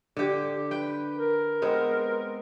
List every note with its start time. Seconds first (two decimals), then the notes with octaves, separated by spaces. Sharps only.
0.17 D3 G4
0.71 B4 G5
1.16 A#4
1.62 G#3 B3 C4